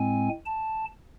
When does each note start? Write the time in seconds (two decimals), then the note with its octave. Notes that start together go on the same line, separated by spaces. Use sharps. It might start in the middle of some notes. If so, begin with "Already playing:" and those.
Already playing: A2 G#3 C4 G#5
0.46 A5